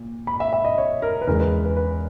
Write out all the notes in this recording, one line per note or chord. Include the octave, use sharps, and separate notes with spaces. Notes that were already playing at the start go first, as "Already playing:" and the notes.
Already playing: A#2
B5
E5
E5
D#5
C#5
A#4
B4
E2 C#3 G#3 A#4
B4
B4
B4